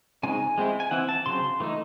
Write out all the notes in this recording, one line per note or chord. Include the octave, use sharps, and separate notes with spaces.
C#3 G#3 C4 D#4 G#5
G#3 C4 E4
G#5
E3 C4 E4 F#5
A5
C#3 F#3 C4 C6
E3 A3 D#4